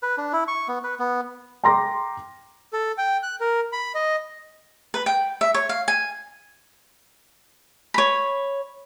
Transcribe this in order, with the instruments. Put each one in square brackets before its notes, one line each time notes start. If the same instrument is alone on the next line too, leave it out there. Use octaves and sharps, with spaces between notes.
[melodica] B4
D4
E4
C#6
B3
B4
B3
[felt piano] G5 A#5 C6 D6 A#6
[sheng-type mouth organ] A4
G5
F#6
A#4
B5
D#5
[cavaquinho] B4
G5
E5
C#5
F5
G#5
C#5 B5